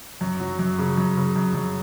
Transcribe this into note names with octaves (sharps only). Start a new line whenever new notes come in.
F#2
F#3
F#2
C#3
F#2
C#3
F#2
F#2